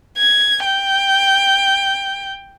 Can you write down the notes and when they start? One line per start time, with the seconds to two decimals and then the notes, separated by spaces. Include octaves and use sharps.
0.18 G#6
0.66 G5